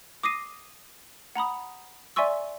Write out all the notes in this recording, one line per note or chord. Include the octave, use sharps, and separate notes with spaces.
D6 D#6 A#6 C7 D#7
F#5 A#5 B5 D#6
D5 E5 G#5 C6 C#6 E6